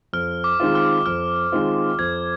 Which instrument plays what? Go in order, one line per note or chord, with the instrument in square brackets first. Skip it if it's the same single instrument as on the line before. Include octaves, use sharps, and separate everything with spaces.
[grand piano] F2 [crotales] F6
[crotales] D6
[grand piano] D#3 G#3 C4 F4
[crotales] F6
[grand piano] F2 [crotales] F6
[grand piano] D#3 G#3 C4 F4
[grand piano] F2 [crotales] G#6